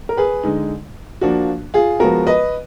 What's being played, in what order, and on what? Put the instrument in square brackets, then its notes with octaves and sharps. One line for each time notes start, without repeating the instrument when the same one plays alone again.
[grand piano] A#4
G#4 B4
D3 G#3 D#4
F3 A#3 D4 F#4
F4 G#4
F3 G#3 B3 F#4 A#4
B4 D#5